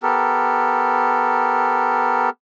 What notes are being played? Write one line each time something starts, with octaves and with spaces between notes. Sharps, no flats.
B3 G4 A4 A#4